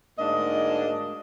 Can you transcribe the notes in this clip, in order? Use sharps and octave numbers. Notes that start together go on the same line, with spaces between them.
D2 G#2 A#3 D4 D#5